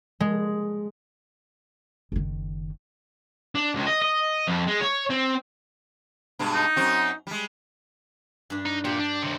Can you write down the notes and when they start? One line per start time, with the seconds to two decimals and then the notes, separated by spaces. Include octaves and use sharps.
0.20 G#3
2.12 F#1 D#3
3.55 D4
3.75 C#2
3.87 D#5
4.02 D#5
4.48 F2
4.67 G#3
4.81 C#5
5.10 C4
6.39 G2 B2 G#3
6.54 D#4
6.76 F#2 C4 F#4
7.27 G3 G#3
8.50 G2 D4
8.66 D#4
8.85 A#2 G4
9.00 D4
9.23 D#2 C3